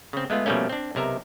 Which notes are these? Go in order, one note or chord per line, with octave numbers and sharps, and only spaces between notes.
C#3 C4
G#3 A3 B3 F4
B2 F3 G3 A3 A#3 C#4
C4 D4
B1 C3 A#4 E5